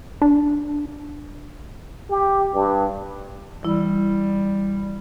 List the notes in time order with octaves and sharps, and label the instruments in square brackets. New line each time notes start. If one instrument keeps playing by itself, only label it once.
[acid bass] D4
[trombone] G4
G2
[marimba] E3 E4 [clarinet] G3